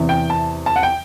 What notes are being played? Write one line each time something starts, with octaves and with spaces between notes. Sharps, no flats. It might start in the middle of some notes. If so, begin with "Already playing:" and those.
Already playing: E2 C3 E3
G5
A5
A5
F#5
G5